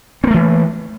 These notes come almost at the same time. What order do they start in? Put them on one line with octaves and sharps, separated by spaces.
C4 A#3 A3 E3